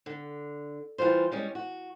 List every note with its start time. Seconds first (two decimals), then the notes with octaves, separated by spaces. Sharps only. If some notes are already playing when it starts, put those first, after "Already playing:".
0.06 D3
0.98 E3 G3 F4 C5
1.32 G3 G#3 C#4
1.55 F#4